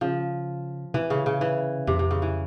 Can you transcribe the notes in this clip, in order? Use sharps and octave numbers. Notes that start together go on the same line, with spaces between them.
C#3 F3
C3 E3
C#3
C#3
E3
F2 C3
C3
C#3
E3